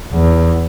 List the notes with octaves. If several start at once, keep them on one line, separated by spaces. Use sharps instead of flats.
E2